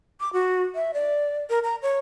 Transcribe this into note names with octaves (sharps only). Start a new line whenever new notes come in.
D6
F#4
E5
D5
A#4
A#5
C#5